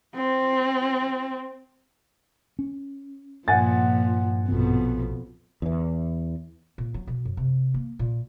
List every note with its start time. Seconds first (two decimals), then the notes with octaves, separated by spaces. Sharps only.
0.15 C4
2.59 C#4
3.48 G2 A#2 F3 F#5 G#5 A6
4.48 A#1 F2 B2 B3
5.62 E2 E3
6.78 A#2
6.94 F#3
7.07 B2
7.25 F#2
7.37 C3
7.74 A#3
7.99 A#2